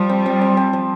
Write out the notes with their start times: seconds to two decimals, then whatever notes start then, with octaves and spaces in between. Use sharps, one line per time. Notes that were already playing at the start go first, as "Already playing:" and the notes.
Already playing: F3 G3
0.09 C4
0.26 C4
0.41 C4
0.57 C4
0.73 F3